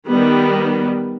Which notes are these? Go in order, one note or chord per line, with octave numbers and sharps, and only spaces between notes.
D#3 G3 B3